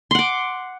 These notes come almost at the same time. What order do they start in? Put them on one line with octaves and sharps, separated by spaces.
C6 F#5 D6